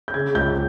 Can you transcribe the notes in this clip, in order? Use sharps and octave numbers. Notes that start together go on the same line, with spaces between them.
G6
C#3 G#6
C#2 G6